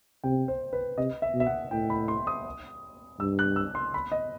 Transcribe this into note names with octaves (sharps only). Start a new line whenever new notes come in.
C3 G5
C5
B4
C3 D#5
E5
B2
E5
F#5
A2 G5
B5
C6
D#6
G2 E6
F#6
E6
C6
B5
D#5